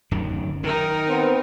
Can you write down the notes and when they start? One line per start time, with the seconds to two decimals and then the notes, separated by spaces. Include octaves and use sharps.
0.11 D1 F#2 D#3
0.64 D#3 D#4 A#4
1.06 B3 C4